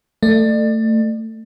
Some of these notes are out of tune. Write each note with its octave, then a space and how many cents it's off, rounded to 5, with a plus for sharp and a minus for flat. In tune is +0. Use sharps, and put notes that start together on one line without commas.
A3 +20 D5 +40